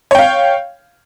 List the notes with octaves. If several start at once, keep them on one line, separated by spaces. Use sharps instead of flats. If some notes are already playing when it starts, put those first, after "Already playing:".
C#5 F5 G5